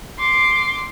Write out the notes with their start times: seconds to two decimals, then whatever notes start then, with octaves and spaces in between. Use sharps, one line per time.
0.19 C6 D6